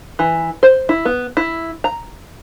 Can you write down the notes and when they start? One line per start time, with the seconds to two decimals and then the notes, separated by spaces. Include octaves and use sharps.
0.19 E3
0.63 C5
0.89 E4
1.05 B3
1.37 E4
1.84 A#5